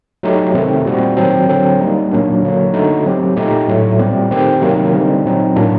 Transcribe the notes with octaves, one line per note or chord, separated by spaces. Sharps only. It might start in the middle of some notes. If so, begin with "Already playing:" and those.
F#3 A3 D#4 G4
C3 D#3 A3 C4
A#2 G3 C4 F#4
D#3 F#3 C4
D3 F#3 C4
G3 A#3 D#4
A#2 F#3 A#3 D4
D3 F#3 A#3
D3 A3 D#4 F#4
F#3 C4 G4
A#2 A3 D#4 G4
A2 F#3 A3
A#2 G3 C4 G4
D#3 A3 C4 G4
C3 D#3 F#3 A#3
D3 G3 C4 D#4
A#2 F#3 C4 D#4
A2 F#3 A#3 D4